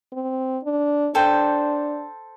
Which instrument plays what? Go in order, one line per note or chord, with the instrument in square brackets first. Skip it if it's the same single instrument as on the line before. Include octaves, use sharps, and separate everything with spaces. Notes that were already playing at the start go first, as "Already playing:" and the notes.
[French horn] C4
D4
[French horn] D4 [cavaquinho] A4 C5 G5